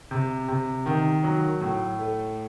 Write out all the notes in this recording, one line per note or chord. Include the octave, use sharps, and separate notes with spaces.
C3
C3
D#3
F#3
A2
A3